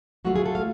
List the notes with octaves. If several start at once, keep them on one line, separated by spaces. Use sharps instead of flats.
F#3 A3 F4 F#4
G#4
A4
F5